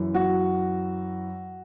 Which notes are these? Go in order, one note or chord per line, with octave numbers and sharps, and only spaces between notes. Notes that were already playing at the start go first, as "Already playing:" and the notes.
Already playing: F#2 E3
F#4